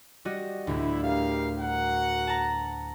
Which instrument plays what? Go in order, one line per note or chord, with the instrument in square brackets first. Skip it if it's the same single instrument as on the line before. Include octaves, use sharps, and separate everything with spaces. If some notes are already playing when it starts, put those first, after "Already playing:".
[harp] G3 F#4 D#5
[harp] D2 A2 [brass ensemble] E4
[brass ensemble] G4 A#4 F5
F#4 A#4 F#5
[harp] A5 A#5